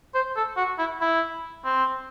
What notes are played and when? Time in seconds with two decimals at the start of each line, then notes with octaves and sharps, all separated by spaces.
0.14 C5
0.36 A4
0.57 F#4
0.78 E4
1.01 E4
1.65 C4